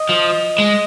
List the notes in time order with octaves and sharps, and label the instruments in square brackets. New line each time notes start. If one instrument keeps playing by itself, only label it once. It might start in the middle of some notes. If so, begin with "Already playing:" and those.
Already playing: [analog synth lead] D#5
[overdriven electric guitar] F3
G#3